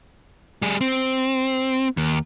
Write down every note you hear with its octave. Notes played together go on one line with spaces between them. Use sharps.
G3 G#4
C4
D#2